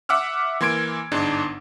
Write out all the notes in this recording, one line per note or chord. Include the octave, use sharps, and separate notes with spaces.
E5 F#5 D6 E6 F6
E3 A#3 C6 G#6 D7
G1 G#2 D4 D#4